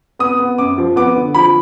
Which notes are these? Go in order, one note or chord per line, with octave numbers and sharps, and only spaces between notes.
B3 D#6
B3
F#2 D6
F3
B3 D6
D3
F3 B5